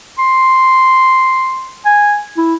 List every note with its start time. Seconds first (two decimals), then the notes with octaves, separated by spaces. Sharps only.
0.19 C6
1.85 G#5
2.37 E4